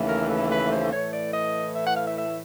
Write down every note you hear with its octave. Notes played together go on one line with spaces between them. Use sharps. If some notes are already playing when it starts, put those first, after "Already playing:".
Already playing: D#2 C#3 E3 A3
A#4
B4
B4
C5
A2 E3 A3 C#5
D5
D#5
E5
F#5
F5
E5
E5